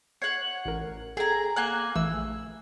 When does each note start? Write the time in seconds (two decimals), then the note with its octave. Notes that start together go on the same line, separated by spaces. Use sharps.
0.22 C#5 F#5 C7
0.65 A1 A#4
1.17 G#4 A4 G5 A#5
1.56 A#3 G#5 F#6
1.95 A#1 E3 A3 E6